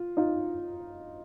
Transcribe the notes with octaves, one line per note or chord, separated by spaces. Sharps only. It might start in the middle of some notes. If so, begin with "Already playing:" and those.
Already playing: F4
D#4 F4